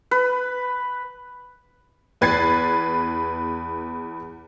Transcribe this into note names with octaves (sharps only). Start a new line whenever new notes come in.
B4
E2 B4 G#6 A6 C7